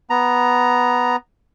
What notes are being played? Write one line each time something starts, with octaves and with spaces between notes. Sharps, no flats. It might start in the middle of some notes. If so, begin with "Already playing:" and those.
B3 A#5